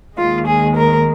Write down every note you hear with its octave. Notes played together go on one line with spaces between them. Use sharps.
D#2 D#3 G#3 F4
G#4
A#4